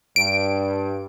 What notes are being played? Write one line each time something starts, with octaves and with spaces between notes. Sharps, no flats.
G2 D7